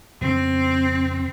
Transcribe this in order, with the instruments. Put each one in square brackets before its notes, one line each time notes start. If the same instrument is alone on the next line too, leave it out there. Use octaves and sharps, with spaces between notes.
[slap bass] F2 C#3 B3 [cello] C4